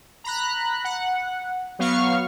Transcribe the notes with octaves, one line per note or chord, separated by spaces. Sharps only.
A#5 B5 F#6
F#5
F#3 B3 F5 C#6 F6